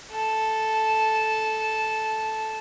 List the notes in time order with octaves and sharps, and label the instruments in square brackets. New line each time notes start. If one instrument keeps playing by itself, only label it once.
[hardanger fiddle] A4 A5